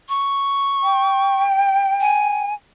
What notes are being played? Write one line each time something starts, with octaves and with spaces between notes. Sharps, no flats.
C#6
G5
G#5